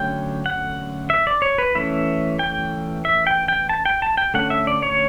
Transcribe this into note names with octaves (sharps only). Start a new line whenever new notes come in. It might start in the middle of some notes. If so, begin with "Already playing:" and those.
Already playing: D3 F#3 A3 C#4 G5
F#5
E5
D5
C#5
B4
E3 A3 C#4 E5
G5
E5
G5
G5
A5
G5
A5
G5
D3 A3 C#4 F#5
E5
D5
C#5